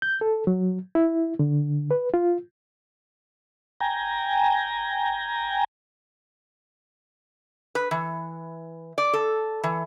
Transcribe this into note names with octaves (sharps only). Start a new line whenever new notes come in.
G6
A4
F#3
E4
D3
B4
F4
G5 G#5 A#5
B4
E3
D5
A4
E3